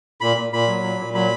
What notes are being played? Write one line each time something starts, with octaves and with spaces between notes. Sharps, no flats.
A#2 B5
A#2
A#2 B5
F#3
A#2
A#2
F#3 B5